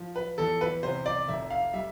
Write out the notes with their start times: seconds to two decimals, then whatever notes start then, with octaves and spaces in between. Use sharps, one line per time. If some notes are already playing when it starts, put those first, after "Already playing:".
Already playing: F3
0.16 B4
0.38 E2 A4
0.61 B4
0.83 C3 C5
1.06 D5
1.28 F1 E5
1.50 F5
1.73 G3 E5